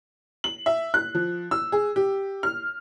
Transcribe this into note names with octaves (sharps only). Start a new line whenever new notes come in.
F#7
E5
F#6
F3
E6
G#4
G4
F6